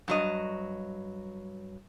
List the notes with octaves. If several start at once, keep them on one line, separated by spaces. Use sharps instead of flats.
G2 F#3 D#5